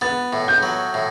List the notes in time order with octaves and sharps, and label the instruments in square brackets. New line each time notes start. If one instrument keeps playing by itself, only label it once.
[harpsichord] B3 [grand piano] A6
[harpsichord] A2
[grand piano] G6
[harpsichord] F#3
A2